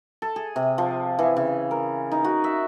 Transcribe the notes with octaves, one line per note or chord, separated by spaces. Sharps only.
A4
G#4
C3
F3
E3
C#3
A#4
D#4
F#4
E5